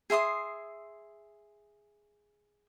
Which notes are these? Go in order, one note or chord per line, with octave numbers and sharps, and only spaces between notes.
G#4 E5 C6 D#6